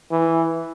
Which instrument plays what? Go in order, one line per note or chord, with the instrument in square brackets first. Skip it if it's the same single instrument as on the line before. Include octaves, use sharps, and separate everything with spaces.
[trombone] E3